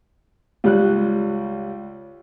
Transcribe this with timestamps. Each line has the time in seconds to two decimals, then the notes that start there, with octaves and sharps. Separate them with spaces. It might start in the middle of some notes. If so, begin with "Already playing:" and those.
0.64 C#2 G3 F#6